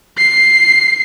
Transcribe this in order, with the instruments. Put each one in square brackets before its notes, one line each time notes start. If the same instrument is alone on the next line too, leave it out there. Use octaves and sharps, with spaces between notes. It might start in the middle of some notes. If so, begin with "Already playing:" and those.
[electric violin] C7